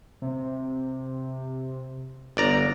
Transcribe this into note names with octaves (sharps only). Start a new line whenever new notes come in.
C3
G1 D5 A#5